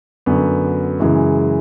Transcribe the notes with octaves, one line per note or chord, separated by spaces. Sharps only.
F#2 D3 F#3 B3
F#2 C#3 E3 G#3